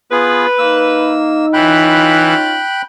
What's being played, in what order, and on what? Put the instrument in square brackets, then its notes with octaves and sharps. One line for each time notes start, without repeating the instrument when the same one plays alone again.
[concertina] B3 F4 G#4 [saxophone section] B4
[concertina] A#3 E6 [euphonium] D#4
[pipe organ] E3 [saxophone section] C#4 F4 [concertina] G5 B5 F#6